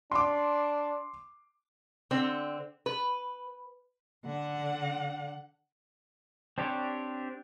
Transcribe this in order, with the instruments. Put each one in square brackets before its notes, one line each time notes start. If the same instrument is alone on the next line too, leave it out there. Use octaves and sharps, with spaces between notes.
[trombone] D4 [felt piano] C6 D6
[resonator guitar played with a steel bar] D3 C4
B4
[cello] D3 F#5
[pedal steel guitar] C4 D4 G4 C#5